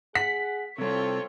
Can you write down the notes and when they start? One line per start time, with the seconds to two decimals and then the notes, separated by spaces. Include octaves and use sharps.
0.15 G#4 F#5 B6
0.78 C3 G3 C4 F4 A4 C#5